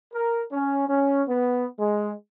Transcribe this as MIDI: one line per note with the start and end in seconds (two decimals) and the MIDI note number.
0.14 0.43 70
0.52 0.86 61
0.88 1.23 61
1.28 1.66 59
1.79 2.13 56